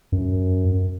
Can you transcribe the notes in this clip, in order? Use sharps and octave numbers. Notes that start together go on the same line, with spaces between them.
F#2